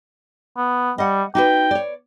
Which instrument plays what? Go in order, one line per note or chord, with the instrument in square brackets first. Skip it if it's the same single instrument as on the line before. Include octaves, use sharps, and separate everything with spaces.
[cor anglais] B3
[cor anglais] G3 [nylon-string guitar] D#5 F#5
[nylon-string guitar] D#4 F#4 B4 [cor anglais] G5
[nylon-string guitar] C#5 D5